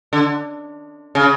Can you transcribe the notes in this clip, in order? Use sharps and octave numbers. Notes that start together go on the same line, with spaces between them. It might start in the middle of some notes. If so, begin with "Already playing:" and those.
D3
C#3